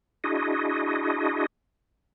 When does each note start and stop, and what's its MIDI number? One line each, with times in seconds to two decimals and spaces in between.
0.24 1.46 62
0.24 1.46 64
0.24 1.46 66
0.24 1.46 68
0.24 1.46 75